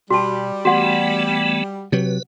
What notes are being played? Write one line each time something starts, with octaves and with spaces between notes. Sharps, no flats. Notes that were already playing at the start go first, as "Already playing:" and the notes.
B2 G3 F#4 A5
E3 A3 B3 F#4 F#5
C3 F#3 B4